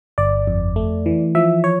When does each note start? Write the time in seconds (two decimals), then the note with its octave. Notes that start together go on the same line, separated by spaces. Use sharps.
0.18 G1 D5
0.47 F2
0.76 A3
1.06 E3
1.35 F3 E5
1.64 C#5